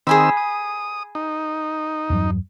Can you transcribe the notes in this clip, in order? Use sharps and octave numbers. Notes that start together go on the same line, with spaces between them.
D#3 C4 G#4 G#5 B5 E6
D#6
D#4
E2 G2 F#3